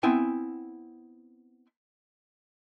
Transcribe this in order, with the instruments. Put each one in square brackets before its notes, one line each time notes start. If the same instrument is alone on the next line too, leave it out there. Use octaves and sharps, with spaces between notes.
[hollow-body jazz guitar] B3 C4 E4 G5 G#5 C6